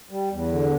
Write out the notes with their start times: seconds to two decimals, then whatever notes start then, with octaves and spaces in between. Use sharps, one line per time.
0.11 G3
0.31 E2
0.52 D3